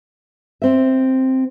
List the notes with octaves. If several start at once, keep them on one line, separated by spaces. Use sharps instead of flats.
C4 E5